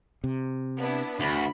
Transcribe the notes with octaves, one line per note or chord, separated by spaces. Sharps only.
C3
B3 D4 E4
D2 B5